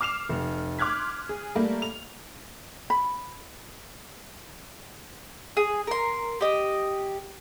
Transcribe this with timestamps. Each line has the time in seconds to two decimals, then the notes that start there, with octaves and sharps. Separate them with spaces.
0.01 D6 F6 C7 E7 F7
0.29 F1
0.79 C6 D6 F6 F#6 G#6 B6
1.29 G#4
1.55 G3 A3 A#3
1.82 F7
2.90 B5
5.57 G#4
5.87 A#4 C6
6.41 G4 D#5